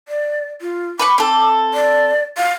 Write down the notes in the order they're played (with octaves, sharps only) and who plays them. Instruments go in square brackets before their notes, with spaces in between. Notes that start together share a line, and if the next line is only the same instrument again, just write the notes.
[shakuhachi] D5
F4
[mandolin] B4 B5 C#6 [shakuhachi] D6
[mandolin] C4 A4
[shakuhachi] D5
F5